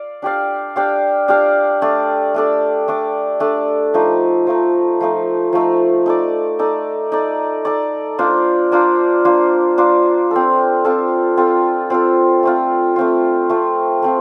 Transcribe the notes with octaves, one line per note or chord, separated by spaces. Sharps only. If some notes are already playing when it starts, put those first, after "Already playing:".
Already playing: D5 F5
D4 G4 D5 F5
D4 G4 D5 F5
D4 G4 D5 F5
A3 D4 A4 D5
A3 D4 A4 D5
A3 D4 A4 D5
A3 D4 A4 D5
F3 A3 D#4
F3 A3 D#4
F3 A3 D#4
F3 A3 D#4
D#4 A4 D5
D#4 A4 D5
D#4 A4 D5
D#4 A4 D5
A#3 D4 F4 C5
A#3 D4 F4 C5
A#3 D4 F4 C5
A#3 D4 F4 C5
C4 F4 A4
C4 F4 A4
C4 F4 A4
C4 F4 A4
A3 C4 F4
A3 C4 F4
A3 C4 F4
A3 C4 F4